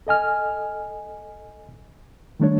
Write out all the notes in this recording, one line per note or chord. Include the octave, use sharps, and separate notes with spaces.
A4 D#5 G#5 F6
D#3 G3 A3 D4 C#5